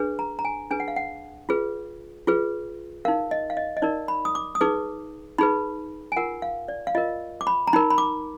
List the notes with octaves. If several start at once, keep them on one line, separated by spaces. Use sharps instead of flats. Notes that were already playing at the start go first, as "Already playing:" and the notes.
Already playing: D4 G#4 B4
A#5
A#5
G#5
D4 G#4 B4 G#5
F#5
F5
F#5
F4 G#4 B4
F4 G#4 B4
D#4 A#4 F5
D#5
F5
D#5
D#5
D#4 A#4 D5
B5
D#6
D6
D#6
D#4 G#4 B4 D6
D#4 G#4 B4 B5
G#5
F4 A#4 F#5
F5
D5
F5
F4 A#4 D#5
D6
B5
A#5
D#4 A#4 B5
B5
D6